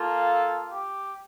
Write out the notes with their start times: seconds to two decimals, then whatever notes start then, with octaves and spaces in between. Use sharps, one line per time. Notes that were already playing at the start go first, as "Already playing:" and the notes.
Already playing: A#3 F4 A4
0.72 G4